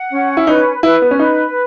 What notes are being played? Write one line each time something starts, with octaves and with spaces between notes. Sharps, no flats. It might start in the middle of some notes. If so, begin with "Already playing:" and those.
Already playing: F#5
C#4
E4
D#4 B4
E4 B4
B3
C#4
D#4 B4